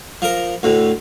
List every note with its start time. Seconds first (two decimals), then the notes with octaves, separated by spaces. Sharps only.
0.22 F3 A#4
0.63 D2 A2